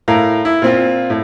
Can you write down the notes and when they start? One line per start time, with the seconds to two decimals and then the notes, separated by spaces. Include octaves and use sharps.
0.08 A2 A#4 F5 A#5
0.45 E4
0.62 A#2 C4 F4
1.10 A2